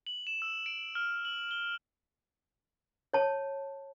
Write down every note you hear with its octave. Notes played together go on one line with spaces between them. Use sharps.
F#7
E7
E6
D7
F6
F#7
G7
C#5 A5